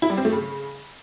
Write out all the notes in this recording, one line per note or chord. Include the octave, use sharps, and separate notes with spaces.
E4
G3
C4
A3
C#3